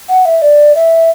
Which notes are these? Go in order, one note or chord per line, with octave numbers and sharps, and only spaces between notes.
F#5
E5
D5
E5